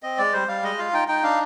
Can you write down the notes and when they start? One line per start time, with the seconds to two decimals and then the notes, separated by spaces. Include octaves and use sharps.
0.03 C4 D#5
0.18 G#3 D5
0.33 G3 C5
0.48 G3 F5
0.63 G#3 D#5
0.78 F4 F5
0.93 D#4 G5
1.08 D#4 G5
1.23 D4 F5